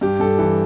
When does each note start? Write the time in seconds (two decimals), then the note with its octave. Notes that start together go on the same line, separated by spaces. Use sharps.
0.01 G2 G4
0.20 G2 A4
0.39 E3 A4